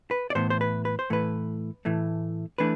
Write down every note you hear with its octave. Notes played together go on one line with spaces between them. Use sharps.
B4
D5
A2 E3 B3 C5
C5
B4
B4
C5
A2 E3 A3 B4
A2 E3 A3
E3 A3 D4 B4